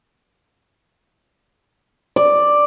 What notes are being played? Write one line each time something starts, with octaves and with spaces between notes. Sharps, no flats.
D5